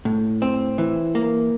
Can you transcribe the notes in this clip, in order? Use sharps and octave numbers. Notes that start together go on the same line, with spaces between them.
A2
C4
E3
A#3